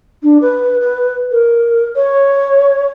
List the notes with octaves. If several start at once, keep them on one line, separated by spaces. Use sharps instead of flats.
D4
B4
B4
A#4
C#5